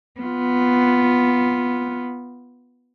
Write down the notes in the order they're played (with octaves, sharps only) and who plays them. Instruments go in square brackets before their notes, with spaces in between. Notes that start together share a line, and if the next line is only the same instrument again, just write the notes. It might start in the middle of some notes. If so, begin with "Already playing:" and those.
[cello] B3 F4